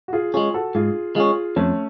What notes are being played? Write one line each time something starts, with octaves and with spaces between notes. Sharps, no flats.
F#4
F4 G#4
G#3 C#4 F4 G#4
F#4 A4
G#2 F4 G#4
G#3 C#4 F4 G#4
F2 A3 C#4